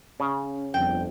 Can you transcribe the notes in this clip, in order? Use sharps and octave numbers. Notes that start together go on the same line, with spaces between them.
C#3 C#4
G1 F2 G5